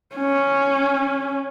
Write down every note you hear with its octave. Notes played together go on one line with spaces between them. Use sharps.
C#4